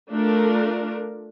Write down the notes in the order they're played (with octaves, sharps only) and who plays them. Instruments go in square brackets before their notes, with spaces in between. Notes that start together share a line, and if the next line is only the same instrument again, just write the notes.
[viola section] A3 D4 F4 A#4